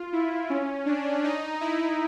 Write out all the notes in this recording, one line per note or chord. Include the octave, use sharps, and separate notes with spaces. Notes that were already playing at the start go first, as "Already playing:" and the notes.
Already playing: F4
E4
C#4
D4
D#4
E4